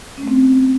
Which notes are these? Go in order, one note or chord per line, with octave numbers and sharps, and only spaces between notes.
A3 C4 C#4